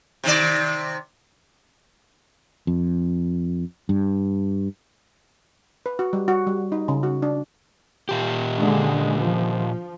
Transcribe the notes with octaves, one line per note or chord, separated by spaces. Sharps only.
C3 D#3 D5
F2
G2
B4
F#4
G3
F#4
G3
D#4
C#3
F#4
D4
A#2 G4
D3 G#3
F3